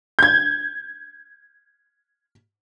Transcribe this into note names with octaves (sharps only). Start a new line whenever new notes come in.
G6 G#6